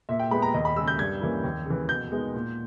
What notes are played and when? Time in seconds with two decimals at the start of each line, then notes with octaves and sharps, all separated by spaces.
0.09 A#2 E5
0.20 G5
0.31 G#3 B3 B5
0.42 A#5
0.54 D#2 D#5
0.65 B5
0.76 C#3 G#3 E6
0.87 G6
0.99 G2 G#6
1.21 E3 A#3 C#4 E4
1.44 D#2
1.66 C#3 E3
1.89 B2 G6
2.12 G#3 B3 D#4
2.34 A#2